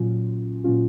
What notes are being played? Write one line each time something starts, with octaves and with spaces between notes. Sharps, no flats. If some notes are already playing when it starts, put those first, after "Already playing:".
Already playing: A#2 F#3 C#4 F4
A#2 F#3 C#4 F4